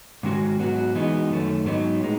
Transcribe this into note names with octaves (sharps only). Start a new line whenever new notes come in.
G#2 D#3 G#3 C#4 F#4
G#2 F#3 B3 F#4
E3 G#3 B3 D#4 F#4
F#2 D#3 A3 C#4
G#2 F#3 B3 D#4
A2 G#3 D#4